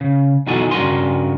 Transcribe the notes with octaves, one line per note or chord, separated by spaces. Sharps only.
C#3
B2 E3 D#4 F#4 A4 G#5
G2 C#3 F#4 A#4 G#5 C6